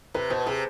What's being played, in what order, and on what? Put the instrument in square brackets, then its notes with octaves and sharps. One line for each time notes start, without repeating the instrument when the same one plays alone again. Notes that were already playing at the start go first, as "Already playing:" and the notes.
[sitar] C3 [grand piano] B4
[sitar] B2 [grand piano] C5
[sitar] C3 [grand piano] G#4